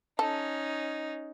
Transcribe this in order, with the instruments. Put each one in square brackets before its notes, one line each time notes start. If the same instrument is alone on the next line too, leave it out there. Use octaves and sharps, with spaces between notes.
[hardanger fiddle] C#4 D#4 [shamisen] A4